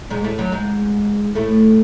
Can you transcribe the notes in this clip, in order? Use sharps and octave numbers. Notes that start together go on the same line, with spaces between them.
G#2 G#3
A2 A3
F#2 F#3
G#2 G#3
A2 A3